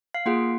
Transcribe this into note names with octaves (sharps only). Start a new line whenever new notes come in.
F5
A#3 F4 G#4 F#5